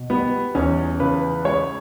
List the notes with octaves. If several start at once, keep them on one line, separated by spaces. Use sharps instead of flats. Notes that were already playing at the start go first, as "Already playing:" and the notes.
Already playing: B2
G3 B3
E2 C#4
C#3 B4
G#3 C#5